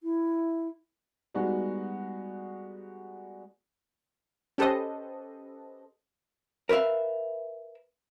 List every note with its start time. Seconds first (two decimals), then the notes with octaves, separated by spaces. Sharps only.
0.03 E4
1.34 G3 G#3 B3 D#4 F#4
4.58 C#4 G4 A4 B4 C5 D#5
6.69 A#4 B4 C#5 E5 F5